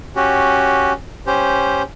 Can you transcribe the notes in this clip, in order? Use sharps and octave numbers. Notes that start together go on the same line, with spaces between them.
C#4 F#4 G4
C#4 G4 C5